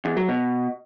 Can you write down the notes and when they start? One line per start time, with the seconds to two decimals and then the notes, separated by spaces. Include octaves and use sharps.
0.05 E2
0.17 F#3
0.29 B2